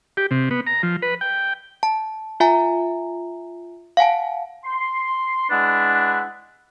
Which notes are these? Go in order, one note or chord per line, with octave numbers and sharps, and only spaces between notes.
G4
C3
B3
A#5
F3
B4
G5
A5
F4 E5 G#5 A#5
F5 F#5 G#5 A5
C6
G#3 D4 E4 B4 F#5